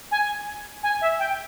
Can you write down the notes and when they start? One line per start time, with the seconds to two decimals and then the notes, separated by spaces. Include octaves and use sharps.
0.11 G#5
0.83 G#5
1.01 E5
1.19 G5